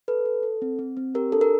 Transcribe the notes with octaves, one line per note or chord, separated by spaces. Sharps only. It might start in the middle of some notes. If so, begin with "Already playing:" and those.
A4 B4
A4
A4
C4
C4
C4
G4 A#4
D4 A4
A#4